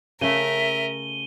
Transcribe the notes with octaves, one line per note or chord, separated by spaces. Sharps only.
C#3 A3 A#4 E5 D#7 G7